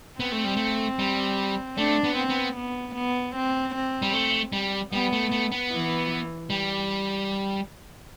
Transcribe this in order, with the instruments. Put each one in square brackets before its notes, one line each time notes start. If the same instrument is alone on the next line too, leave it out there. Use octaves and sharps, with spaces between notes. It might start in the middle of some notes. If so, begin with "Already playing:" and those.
[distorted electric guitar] B3 [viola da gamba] C4
[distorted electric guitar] A3
G3
A3
G3
[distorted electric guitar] A3 [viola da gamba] D4
[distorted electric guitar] B3
[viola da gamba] C4
[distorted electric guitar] B3
[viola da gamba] B3
B3
C4
C4
[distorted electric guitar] G3
A3
G3
[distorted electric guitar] G3 [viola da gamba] B3
[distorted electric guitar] A3
A3
B3
[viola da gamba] E3
[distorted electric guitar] G3